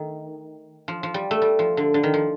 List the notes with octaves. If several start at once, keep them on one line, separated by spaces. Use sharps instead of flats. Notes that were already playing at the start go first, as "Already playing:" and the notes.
Already playing: D#3 A3
F3
F3
G3
A3
G3
F3
D3
D3
D#3
F3